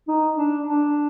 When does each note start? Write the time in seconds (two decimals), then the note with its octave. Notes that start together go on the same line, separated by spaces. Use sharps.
0.08 D#4
0.37 D4
0.66 D4